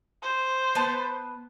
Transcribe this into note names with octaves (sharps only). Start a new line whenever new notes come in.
C5
B3 B4 A5